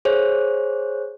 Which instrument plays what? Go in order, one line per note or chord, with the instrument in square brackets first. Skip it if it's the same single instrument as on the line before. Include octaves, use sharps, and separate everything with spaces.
[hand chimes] G#4 C5 C#5